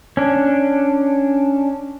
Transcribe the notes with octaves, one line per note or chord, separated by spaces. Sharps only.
C#4 D4